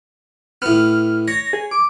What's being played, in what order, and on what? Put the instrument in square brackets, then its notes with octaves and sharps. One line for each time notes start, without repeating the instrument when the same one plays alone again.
[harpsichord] A2 B3 [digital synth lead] F6
[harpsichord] C#5 [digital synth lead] A#6
[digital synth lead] G#4
D6